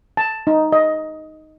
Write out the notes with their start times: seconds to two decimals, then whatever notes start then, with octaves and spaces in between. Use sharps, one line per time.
0.17 A5
0.47 D#4
0.72 D#5